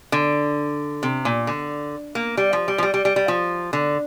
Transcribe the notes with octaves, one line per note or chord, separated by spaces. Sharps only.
D3
C3
A#2
D3
A#3
G3
F3
G3
F3
G3
G3
G3
G3
F3
D3